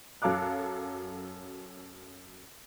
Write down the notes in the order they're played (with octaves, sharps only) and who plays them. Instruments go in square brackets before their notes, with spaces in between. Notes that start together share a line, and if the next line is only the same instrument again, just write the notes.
[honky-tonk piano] F#2 F#3 A4 F5 D6 F#6